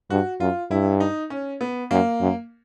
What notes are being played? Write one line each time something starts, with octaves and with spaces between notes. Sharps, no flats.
G2 F#4
F#2 F4
G2 E4
D#4
C#4
B3
F#2 A#3
F#2